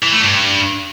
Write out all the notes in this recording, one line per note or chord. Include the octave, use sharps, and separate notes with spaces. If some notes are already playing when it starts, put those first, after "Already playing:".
E3
A3
G2